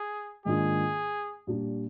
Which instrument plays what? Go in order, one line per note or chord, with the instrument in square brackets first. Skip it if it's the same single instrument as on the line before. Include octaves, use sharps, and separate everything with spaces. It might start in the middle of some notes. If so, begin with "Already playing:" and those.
Already playing: [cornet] G#4
[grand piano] G#2 D#3 A#3 D4 F4 [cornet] G#4
[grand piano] A#2 G3 D4